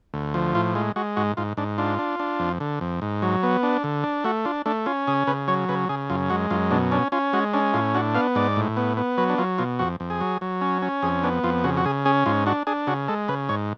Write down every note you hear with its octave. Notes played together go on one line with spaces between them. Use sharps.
D2
F3
A2 F4
G#3 F4
G#3 F#4
G#2 F#4
G#2 F4
G#2 D4
D4 F4
D4
D4
F2
D3
F2
G#2
F#3
B3
D4
D3
D4
A3 F#4
D4 F4
A3 D4
C#4 F4
C#3 G#4
C#3 B4
F#3 C#5
C#3 B4
C#3 G#4
F#2 F4
G#3 F#4
F#2 F4
B2 D4
C#4 D4
C#4 F4
G#3 F#4
C#4 D4
A2 F4
D4 F#4
B3 F5
G#2 D5
A2
B3
B3
F#3 B4
D4
F#3 F4
B2 F4
F2 F#4
F2
G#4
F#3
F#3
C#4
C#4
F2 G#4
B3 D4
F2 F4
C#3 F#4
F#4
C#3 G#4
C#4 G#4
G#2 F4
D4 F#4
D4 G#4
C#3 F#4
G#3 A4
C#3 B4
G#2 C#5